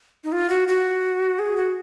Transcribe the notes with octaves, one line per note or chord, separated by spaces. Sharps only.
D#4
F4
F#4
F#4
G#4
F#4